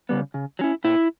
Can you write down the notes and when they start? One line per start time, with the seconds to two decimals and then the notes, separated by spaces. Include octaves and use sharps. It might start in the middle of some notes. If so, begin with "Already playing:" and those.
0.09 C#3 G3 B3
0.34 C#3
0.59 F#3 C#4 E4
0.84 A#2 E4